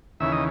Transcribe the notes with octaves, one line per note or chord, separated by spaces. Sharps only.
D#2 C#3 E3 E5
D#5